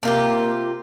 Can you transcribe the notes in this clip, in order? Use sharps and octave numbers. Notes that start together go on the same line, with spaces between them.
C3 A#3 F4 G4